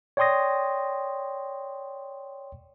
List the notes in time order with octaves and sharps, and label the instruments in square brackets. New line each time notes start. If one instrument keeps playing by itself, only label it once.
[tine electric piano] C#5 D5 G5 C6 D#6 A#6